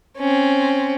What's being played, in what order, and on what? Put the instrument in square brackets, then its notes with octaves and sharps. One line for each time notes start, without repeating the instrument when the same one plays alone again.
[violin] C4 C#4